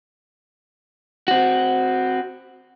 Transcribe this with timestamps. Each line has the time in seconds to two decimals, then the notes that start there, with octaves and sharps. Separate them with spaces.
1.28 C4 F#4